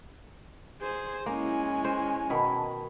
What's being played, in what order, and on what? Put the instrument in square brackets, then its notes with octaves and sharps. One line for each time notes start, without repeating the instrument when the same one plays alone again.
[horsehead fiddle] G#4 C5
[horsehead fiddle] G#3 C#4 [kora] A#3 [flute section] E4 G#5
[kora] C5
[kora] B2 [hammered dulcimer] D#3 B5 [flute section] A5